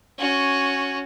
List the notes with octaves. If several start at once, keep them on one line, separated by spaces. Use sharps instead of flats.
C#4 F#4